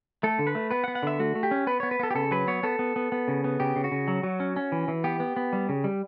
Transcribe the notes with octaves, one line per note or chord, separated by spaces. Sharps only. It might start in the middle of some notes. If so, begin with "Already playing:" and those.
A3 A4
D3
B4
A3
B3 B4
F#5
B3
F#5
D3 E5
A3 F#4
A3
G4
C#4
B3 B4
B3 C#5
B4
B3 A4
G4
C#3 A4
F#3 B4
B3 C#5
B3 A4
B3
B3
B3
C#3
B3
C#3 G4
C#3
F#4
C#3
F#3
F#3
C#4
C#4
E3
E3
B3 G4
B3
B3
G3
C#3
G3